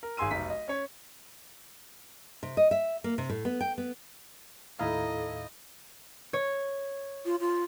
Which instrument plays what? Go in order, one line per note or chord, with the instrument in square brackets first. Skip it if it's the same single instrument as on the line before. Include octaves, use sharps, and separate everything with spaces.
[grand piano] A#4
G#1 G#4 G#5 C6 E6 D#7
F1 B1 D#4 B6
D#5
C#4 C#5
[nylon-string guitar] C3
D#5
E5
A#3
C3
A2
B3
G5
B3
[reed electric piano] D#2 A2 F5 [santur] D#4 E4 [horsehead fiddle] A4 [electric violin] D#5
[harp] C#5
[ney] F4
F4